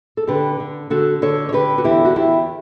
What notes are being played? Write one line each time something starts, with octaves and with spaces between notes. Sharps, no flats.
A4
D3 G4 B4
D3
D3 F#4 A4
D3 A4 C#5
C#5
D3 G4 B4
F#4
E2 E4 G4
F#4
E2 E4 G4